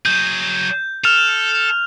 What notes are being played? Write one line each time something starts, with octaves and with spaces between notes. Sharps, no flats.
F#3 G#4 G6
A4 F6 F7